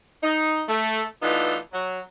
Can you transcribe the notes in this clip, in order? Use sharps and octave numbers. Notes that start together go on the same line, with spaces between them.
D#4
A3
E3 A3 B3 D4 D#4 F4
F#3